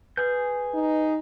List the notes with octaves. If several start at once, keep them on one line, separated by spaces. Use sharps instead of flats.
G#4 B4 G#5 G6
D#4